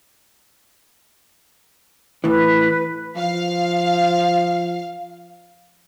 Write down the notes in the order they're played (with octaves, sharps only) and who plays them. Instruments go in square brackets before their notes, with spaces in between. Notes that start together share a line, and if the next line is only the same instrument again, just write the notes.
[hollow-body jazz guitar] A2 E3 [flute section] B4
[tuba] F3 [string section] F5